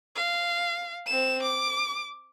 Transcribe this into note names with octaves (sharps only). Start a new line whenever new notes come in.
F5
C4 E7
D6